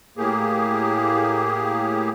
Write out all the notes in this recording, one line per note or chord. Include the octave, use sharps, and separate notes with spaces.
A2 A#3 G4 G#4